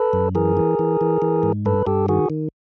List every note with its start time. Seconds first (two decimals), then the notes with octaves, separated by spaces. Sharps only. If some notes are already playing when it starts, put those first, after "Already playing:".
Already playing: A4 B4
0.13 F#2
0.35 E3 G#4 A#4
0.57 E3
0.79 E3
1.01 E3
1.22 E3
1.43 G#2
1.65 G2 A4 B4
1.87 G2 G4 A4
2.08 D#3 F#4 G#4
2.30 D#3